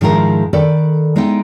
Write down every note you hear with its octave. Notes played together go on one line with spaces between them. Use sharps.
G#2 D#3 F3 G#3 E4 A#4
D#3 A4 B4 D5
G#3 B3 D#4 E4 G5